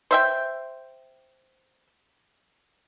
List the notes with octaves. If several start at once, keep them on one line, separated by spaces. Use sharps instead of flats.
C5 E5 G5